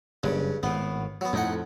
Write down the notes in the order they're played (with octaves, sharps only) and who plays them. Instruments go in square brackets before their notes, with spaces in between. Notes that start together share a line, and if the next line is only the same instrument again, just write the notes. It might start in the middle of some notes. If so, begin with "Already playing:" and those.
[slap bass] F#1 [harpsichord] G2 C#3
[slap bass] G#1 A2 [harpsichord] B3
[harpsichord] F#3 B3
[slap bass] F2 [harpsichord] A2 D#4 F#5